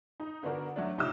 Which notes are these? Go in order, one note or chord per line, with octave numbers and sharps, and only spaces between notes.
D#4
D3 B3 D4 F#4 A#4
F#3 A3 D4
A1 C3 D#4 F4 D6 E6